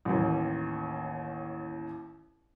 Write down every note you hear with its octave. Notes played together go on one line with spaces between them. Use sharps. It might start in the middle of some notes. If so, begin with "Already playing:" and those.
A1 D#2